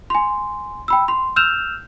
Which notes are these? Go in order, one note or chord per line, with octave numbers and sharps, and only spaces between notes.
G#5 C6
G5 B5 E6
C6
E6 F6 G6 E7 F7